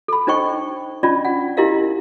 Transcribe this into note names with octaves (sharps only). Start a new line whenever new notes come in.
A4 B5
D4 D#4 C5 D#5 G5 C#6
C#4 D4 F4 D5 D#5 B5
F#5
D#4 E4 G4 A#4 D#5 F5